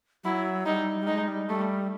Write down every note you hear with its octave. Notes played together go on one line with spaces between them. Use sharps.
F#3 E4
G3 D#4
G3
G#3 D#4
G3
G3 A3